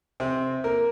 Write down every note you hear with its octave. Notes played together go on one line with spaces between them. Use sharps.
C3 C4
A#3 A#4